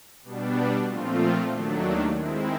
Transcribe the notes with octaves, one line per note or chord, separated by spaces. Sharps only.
B2 G3 B3 D4
A#2 F3 A3 C4 F4
D#2 D#3 F#3 A3 D4
D#3 G#3 C4 E4